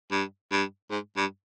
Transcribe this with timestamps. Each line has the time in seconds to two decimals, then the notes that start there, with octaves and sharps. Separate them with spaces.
0.11 G2
0.52 G2
0.91 G#2
1.17 G2